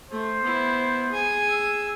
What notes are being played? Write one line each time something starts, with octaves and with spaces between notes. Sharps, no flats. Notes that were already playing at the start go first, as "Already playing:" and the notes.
A3 C5
B3 E4
G#4 G#5
E6